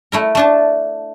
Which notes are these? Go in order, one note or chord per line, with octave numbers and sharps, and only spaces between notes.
A3 E4 A#4
A3 D4 A5